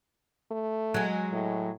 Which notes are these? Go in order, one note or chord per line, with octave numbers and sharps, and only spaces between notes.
A3
F#3 G#3
A2